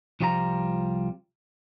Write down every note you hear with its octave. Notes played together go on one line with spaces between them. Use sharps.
C2 F3 G3 F4 C5 A#5